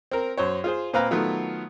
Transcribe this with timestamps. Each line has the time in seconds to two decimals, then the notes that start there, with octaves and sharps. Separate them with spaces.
0.12 C4 A#4
0.37 F#2 C5 C#5
0.64 F4 G#4 C5
0.93 A#2 C4 B4 F5 A#5
1.11 D#3 F#3 A3 B3 F4